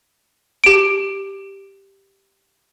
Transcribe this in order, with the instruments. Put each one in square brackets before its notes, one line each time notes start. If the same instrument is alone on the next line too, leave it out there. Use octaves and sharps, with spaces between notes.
[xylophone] G4 D7